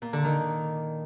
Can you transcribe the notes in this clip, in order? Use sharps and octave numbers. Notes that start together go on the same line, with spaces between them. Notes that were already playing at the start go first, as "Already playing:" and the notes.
A#2
D3
D#3